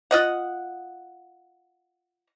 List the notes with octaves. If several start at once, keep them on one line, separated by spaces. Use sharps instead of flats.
F4 D#5 F#5